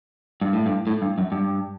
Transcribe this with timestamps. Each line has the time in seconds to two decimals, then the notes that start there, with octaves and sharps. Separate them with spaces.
0.41 G2
0.53 A2
0.66 G2
0.87 A2
1.02 G2
1.18 F#2
1.32 G2